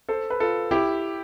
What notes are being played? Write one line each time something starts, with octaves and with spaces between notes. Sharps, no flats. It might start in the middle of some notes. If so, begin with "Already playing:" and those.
A4 C5
B4
F4 A4
E4 G4